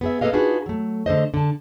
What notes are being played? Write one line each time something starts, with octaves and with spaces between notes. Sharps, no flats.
B3 G#4 E5
A#3 B3 A4 B4 D#5 F5
D4 D#4 F4 F#4 G#4 B4
F#3 A3
D3 A3 C5 D#5
D3 A5